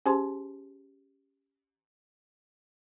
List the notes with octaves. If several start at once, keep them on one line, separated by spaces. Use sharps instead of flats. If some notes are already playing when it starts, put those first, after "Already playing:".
C#4 G4 G#4 C5 A5 C6